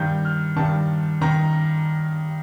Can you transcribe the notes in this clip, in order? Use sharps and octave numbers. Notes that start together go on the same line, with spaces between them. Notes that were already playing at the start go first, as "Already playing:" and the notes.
Already playing: G2 D#3 G6
F6
G2 D#3 A5
D#3 A#5